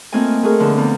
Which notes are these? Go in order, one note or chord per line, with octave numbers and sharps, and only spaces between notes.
A3 A#3 C4 F4 D#5 G#5
A3 F#4 G#4 A#4
B2 D3 F3
E2 F3